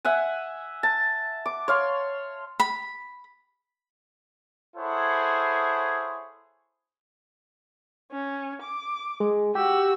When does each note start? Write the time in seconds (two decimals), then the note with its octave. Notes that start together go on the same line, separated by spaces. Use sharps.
0.05 E5 F#5 G#5
0.83 A5
1.46 D6
1.68 C#5 F5 C6
2.60 B5
4.77 E4 G#4 A4 C5 C#5 F#5
8.12 C#4
8.62 D6
9.20 G#3
9.55 F#4 G4 E6